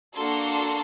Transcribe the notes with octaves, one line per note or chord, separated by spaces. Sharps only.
A#3 D4 F#4 A4 A5 C6